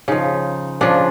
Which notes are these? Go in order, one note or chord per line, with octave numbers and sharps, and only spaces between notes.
C#3 F3 D#4
C#3 F3 D4